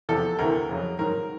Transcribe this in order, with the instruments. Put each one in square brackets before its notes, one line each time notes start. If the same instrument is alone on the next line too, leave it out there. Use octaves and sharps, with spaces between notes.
[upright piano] E2 C3 F3 A4
D2 C3 E3 A#4
F2 C#3 F#3
G#2 D#3 F#3 A#4